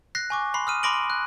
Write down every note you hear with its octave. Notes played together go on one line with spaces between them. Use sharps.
F#6 A#6 C7
G#5 C#6 D6
B5 C6 C7
D#6 F6 D#7
B5 C6 D6 A#6 D7 F#7
F#6